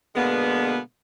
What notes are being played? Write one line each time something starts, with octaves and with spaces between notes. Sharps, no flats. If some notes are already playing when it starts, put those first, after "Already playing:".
B2 D3 G#3 A#3 B3